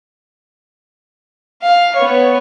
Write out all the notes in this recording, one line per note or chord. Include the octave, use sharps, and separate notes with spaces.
F5
B3 C#5